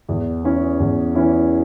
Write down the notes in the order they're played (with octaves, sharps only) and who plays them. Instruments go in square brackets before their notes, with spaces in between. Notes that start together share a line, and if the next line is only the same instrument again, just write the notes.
[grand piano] E2
E3 C#4 E4
E2
E3 C#4 E4